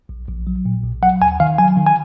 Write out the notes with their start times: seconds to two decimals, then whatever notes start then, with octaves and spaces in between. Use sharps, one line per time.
0.09 A#1
0.28 A#1
0.47 F#3
0.66 A#2
0.84 A#1
1.02 F#3 F#5
1.21 D#2 G#5
1.40 D#3 F5
1.58 F#3 G#5
1.77 D#3
1.86 G#5